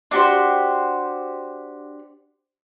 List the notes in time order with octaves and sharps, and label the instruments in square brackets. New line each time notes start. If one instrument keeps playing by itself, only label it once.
[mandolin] D4 F#4 G4 C5